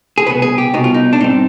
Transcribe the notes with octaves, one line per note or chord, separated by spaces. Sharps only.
G#4
C2 B2 B3 B4
G#4
G4
C2 B2 B3 D#4
F4
D#4
D4
G#2 G3 C4 D#4